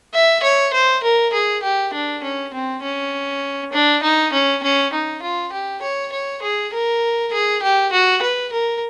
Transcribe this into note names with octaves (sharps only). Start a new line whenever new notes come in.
E5
C#5
C5
A#4
G#4
G4
D4
C#4
C4
C#4
D4
D#4
C#4
C#4
D#4
F4
G4
C#5
C#5
G#4
A#4
G#4
G4
F#4
B4
A#4